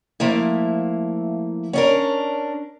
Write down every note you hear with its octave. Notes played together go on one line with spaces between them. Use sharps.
F3 A3 A#3 E4
C#4 D4 A#4